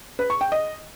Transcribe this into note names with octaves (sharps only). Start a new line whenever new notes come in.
B4
C#6
G5
D#5